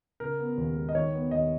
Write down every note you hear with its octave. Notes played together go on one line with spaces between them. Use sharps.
C#3 A#4
B3
D#2
G#3
D#5
D#3 C#5
B3
D#2 D#5